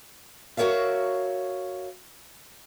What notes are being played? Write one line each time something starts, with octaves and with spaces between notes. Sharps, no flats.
F#4 A#4 C#5 E5 F5